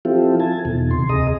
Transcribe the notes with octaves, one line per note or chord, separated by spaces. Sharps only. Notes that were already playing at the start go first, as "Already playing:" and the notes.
F3 C4 E4 F4 G4 A4
A4 G#5 A5
E2 B2 D#3
C3 C6
D2 C3 G#4 D#5 A#5 D#6